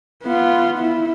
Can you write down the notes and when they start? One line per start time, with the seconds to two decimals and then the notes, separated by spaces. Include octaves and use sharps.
0.24 B3 F4
0.78 E4